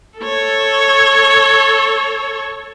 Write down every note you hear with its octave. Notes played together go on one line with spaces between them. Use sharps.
A4 C#5